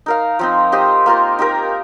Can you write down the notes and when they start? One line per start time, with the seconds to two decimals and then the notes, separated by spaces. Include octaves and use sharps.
0.06 D#4 A#4 F5
0.39 F3 C4 D#4
0.72 D#4 G4 C5 D#5
1.06 A#3 F4 A#4
1.39 D#4 G4 A#4